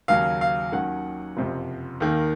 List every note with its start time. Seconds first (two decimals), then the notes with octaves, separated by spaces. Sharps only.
0.08 D#2 C#3 F#3 C#4 F5
0.41 F5
0.72 D#2 D#3 F#3 C#4 F#5
1.37 F#1 F2 C3 F3
2.00 D#2 D#3 A#3